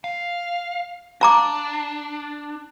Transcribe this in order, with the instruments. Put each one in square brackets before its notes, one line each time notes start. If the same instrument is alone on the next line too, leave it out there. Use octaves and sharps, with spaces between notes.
[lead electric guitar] F5
[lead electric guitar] D4 [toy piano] F5 A#5 D6